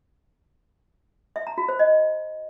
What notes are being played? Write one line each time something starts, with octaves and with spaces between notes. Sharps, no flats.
E5
A#5
F#4
C5
D#5